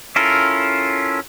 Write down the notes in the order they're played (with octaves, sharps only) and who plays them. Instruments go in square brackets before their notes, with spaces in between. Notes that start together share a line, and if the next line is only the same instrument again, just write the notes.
[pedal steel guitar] C#4 E4 F4 A4 A#4